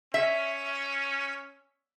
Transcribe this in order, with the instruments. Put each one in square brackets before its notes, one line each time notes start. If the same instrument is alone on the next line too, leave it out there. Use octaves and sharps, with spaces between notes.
[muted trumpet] C#4 [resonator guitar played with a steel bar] E5